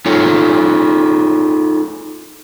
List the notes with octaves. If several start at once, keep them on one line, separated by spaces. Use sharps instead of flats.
D#4 F4 G#4 A4 C#5